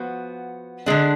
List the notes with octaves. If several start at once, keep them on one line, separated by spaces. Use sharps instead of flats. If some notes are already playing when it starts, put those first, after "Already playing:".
Already playing: F3 B3 F#4
D3 G#3 D4